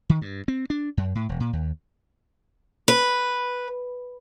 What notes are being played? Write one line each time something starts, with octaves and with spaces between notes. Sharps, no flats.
D#3
G2
C4
D4
F#2
A2
E1
A#2
D#2
B4